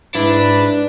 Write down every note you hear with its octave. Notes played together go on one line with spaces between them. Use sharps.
G#2 D4 E4 B4